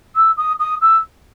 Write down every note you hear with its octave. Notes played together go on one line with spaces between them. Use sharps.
E6
D#6
D#6
E6